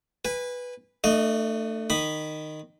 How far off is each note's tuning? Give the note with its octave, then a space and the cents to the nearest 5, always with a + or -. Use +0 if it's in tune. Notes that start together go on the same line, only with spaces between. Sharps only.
B4 +0 G#5 -30
A3 +20 D4 +45 D#5 +0
D#3 -15 B5 +0 D#6 -15